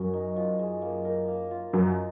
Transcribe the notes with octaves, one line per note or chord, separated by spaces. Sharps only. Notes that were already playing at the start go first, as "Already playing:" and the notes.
Already playing: F#2 C#4 F#4 A#4
D#4
F3
G#3
A#3
A#4
A#3
F4
F#2 D#5
C5